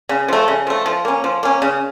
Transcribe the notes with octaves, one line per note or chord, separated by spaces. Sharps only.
C#3
F3 A3
C#3
F3 A3
F3
A#3 C#4
F3
A#3 C#4
C#3